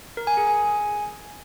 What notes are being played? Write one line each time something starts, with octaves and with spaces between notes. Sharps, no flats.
A#4
G#5
G#4
G#5